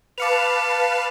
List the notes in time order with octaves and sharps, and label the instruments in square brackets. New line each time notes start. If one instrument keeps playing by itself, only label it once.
[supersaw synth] B4 F5 A5 [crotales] D6 C#7 F7